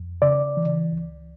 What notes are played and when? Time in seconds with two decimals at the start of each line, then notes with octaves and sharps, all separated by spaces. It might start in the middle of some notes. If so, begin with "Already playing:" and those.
Already playing: F2
0.22 C#3 D5
0.57 E3
0.92 C#2